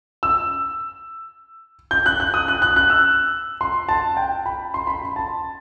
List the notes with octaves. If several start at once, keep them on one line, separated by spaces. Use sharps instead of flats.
E6
G6
F#6
F#6
D#6
F#6
F#6
F#6
E6
C6
A5
G5
B5
C6
B5
C6
A5